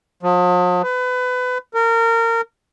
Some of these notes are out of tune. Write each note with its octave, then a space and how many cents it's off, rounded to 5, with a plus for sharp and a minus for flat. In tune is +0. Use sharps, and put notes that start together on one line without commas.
F3 +45
B4 +25
A#4 -25